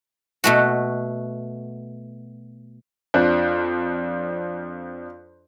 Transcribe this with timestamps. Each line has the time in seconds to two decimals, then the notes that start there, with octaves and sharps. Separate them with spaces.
0.44 B2 A3 F#4
3.14 F2 F3 D4 F#6